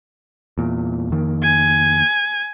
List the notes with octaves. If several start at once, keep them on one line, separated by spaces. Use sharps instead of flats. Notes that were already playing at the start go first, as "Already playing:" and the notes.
E2 A#2
F2 D#3 A#3
G#5